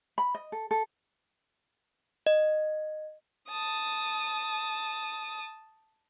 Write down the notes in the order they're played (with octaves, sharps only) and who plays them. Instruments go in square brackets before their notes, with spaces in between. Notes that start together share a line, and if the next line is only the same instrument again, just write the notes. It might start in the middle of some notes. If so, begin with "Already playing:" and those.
[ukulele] B5
D#5
A4
A4
[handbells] D#5
[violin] A5 D#6